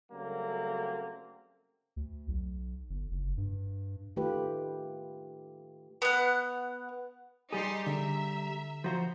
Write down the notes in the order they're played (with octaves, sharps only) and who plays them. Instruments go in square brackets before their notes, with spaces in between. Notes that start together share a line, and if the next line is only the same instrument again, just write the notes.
[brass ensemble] C#3 F#3 G3 A3 A#3 C4
[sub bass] D2
B1
G1
F#1
G2
[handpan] D#3 A3 F4 G4 B4
[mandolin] B3 F#5
[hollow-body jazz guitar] G3 G#4 [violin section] D#4 G4 C6
[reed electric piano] D3 [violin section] E5 [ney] A#5
[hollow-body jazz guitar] F3 F#4 C5 [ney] A#5